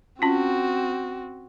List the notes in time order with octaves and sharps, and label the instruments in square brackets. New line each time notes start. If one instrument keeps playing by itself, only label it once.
[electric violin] C4 F#4 [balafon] C#4 F4